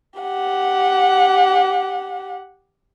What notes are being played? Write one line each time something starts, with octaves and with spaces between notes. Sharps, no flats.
G4 F#5